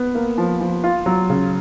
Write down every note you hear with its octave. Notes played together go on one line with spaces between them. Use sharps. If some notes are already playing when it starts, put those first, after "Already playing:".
Already playing: B3
A#3
F3
F3
F4
F#3
C#3